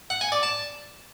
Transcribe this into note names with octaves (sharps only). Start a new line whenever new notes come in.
F#5
G#5
D5
A5